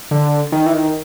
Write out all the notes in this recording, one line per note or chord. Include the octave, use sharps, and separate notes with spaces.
D3
D#3
E3
D#3